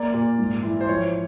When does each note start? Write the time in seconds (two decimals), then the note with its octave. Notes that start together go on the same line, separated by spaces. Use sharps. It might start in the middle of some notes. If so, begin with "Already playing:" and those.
Already playing: A#3 D5
0.14 A#2
0.38 G#2
0.63 E3
0.81 C5
0.89 F3 C#5